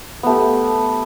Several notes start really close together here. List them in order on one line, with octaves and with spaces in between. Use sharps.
B3 A3 G4